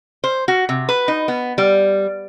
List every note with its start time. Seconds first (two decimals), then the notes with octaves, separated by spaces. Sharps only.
0.24 C5
0.48 F#4
0.69 C3
0.89 B4
1.08 D#4
1.28 B3
1.58 G3